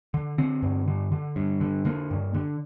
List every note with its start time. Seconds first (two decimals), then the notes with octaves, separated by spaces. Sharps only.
0.14 D3
0.38 D3 C4
0.63 G2
0.88 D3
1.12 D3
1.36 G2
1.61 D3
1.85 D3 A#3
2.11 G2
2.34 D3